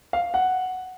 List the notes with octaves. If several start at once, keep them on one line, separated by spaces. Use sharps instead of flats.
F5
F#5